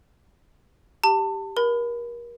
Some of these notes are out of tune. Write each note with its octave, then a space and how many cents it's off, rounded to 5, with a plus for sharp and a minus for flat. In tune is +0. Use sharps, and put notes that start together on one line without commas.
G4 +0 A5 +25
A#4 +30 B5 +20